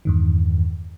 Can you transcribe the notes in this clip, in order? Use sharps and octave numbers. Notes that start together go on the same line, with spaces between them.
E2 G2 D#3